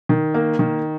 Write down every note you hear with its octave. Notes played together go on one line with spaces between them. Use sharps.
D#3
A#3
D#3